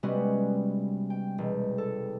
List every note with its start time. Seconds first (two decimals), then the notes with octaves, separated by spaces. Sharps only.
0.03 C3 G3 G#3 B3 C#4 F#4
1.10 G5
1.38 E1
1.78 A4